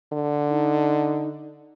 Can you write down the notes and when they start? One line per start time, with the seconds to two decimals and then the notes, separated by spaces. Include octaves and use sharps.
0.13 D3
0.49 D#4